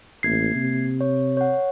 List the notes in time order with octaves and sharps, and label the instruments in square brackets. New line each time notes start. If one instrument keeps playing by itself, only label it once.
[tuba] A1 [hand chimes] A#3 G#6 C7
[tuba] C3
[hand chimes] C#5
C#5 F#5